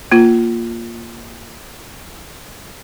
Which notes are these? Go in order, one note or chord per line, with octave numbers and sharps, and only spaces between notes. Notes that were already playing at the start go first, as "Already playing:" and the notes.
A#3 F4